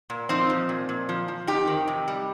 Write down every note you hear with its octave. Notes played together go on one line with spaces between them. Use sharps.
A#2
F3 C4 D#4
F3
A#2
A#2
F3
F3
F2 D#4 G4
D#3
C3
G3